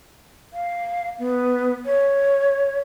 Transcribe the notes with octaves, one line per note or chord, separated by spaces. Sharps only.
F5
B3
C#5